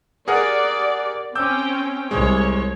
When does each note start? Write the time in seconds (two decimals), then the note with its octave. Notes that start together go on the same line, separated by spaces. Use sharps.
0.28 G4 G#4 A#4 D5 F#5
1.35 C4 C#4 G5 D6 E6 G6
2.11 C2 G#3 C#5